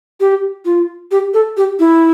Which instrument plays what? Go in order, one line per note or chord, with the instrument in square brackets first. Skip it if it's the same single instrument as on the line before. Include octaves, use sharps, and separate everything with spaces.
[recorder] G4
F4
G4
A4
G4
E4